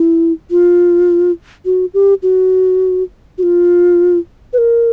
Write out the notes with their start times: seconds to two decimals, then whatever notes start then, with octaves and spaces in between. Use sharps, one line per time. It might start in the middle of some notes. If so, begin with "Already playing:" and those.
Already playing: E4
0.51 F4
1.65 F#4
1.94 G4
2.23 F#4
3.38 F#4
3.43 F4
4.53 B4
4.58 A#4